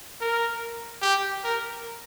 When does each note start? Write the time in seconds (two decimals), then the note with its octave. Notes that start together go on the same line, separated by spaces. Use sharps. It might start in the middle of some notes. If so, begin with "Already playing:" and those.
0.21 A#4
1.02 G4
1.44 A#4